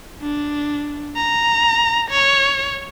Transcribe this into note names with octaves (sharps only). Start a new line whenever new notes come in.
D4
A#5
C#5